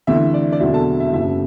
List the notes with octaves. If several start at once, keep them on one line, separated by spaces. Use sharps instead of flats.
D2 C3 E3 E5
D5
D5
E1 D2 C3 F#3 E5
A4 A5
E5
F#1 F#2 F#3 E5